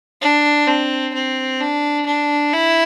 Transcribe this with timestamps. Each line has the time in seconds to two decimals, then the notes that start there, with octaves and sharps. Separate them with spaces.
0.21 D4
0.67 C4
1.14 C4
1.61 D4
2.06 D4
2.53 E4